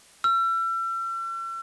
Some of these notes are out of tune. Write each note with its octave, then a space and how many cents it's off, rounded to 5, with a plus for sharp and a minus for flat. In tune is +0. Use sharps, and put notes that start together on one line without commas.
E6 +40